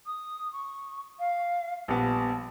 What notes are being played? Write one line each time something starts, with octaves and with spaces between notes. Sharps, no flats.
D#6
C#6
F5
A#1 G3 B3 A5